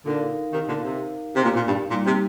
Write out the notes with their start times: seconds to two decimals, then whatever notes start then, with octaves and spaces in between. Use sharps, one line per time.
0.06 A#2 D3 D#4 A#4 F5
0.52 C3 D#3
0.68 A#2 D3
0.83 C3
1.36 C3
1.45 A#2
1.56 A#2
1.68 G2
1.91 A#2 G3 A#3 D#4
2.06 C3